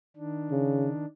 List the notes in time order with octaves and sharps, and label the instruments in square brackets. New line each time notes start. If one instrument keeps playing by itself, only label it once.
[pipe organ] D#3 D4
[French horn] C#3